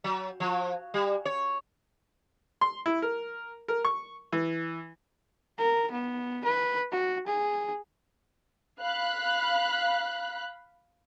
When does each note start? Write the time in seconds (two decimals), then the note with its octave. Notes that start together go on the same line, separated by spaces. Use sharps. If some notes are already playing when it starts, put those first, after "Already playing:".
0.04 F#3
0.40 F3
0.94 G3
1.25 C#5
2.61 C6
2.86 E4
3.02 A#4
3.68 A#4
3.85 C#6
4.32 E3
5.58 A#4
5.92 B3
6.45 B4
6.92 F#4
7.27 G#4
8.81 F5 B5 F#6